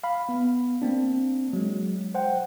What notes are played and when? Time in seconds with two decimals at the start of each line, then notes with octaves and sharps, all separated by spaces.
0.04 F5 B5
0.29 B3
0.82 A#3 C4 D4
1.53 F#3 G#3
2.15 C5 F#5 G5